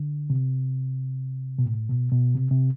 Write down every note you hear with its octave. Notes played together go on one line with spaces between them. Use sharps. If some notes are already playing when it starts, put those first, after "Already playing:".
Already playing: D3
C3
B2
A2
B2
B2
C3
C3